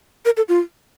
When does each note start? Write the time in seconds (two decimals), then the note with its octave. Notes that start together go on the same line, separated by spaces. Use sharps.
0.25 A#4
0.37 A4
0.49 F4